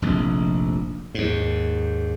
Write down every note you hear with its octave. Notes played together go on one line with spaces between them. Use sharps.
F1 A#1
D#2 G#2